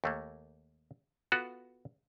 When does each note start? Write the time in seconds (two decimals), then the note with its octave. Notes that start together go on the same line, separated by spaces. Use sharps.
0.04 D#2 A3 A#3
1.32 B3 F4 F#4 A4